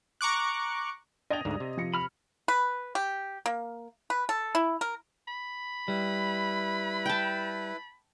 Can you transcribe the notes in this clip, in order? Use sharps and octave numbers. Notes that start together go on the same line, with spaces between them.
A#5 C#6 D6 F#6
D4 D#5 G5 D#6 G#6 A6 F7
D2 G#2 D3 D5
C3
F3 A#6 C#7
B5 F6
B4
G4
A#3
B4
A4
E4
A#4
B5
G3 E4 B4
G5 A5